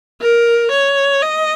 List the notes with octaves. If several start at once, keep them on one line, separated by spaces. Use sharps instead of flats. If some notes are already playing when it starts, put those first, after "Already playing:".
A#4
C#5
D#5